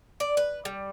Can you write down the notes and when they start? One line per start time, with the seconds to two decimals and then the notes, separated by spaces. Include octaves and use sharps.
0.20 D5
0.37 B4
0.65 G3